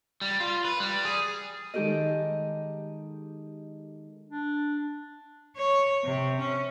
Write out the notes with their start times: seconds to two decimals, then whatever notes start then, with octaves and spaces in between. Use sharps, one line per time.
0.22 G3
0.40 F4
0.65 B4
0.80 G3
1.05 G#4
1.74 D#3 G#3 D#4 G4 A4 D#5
4.29 D4
5.56 C#5
6.04 C3
6.39 C#4